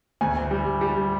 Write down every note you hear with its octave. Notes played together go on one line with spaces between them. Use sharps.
D2 G#5
G3
G3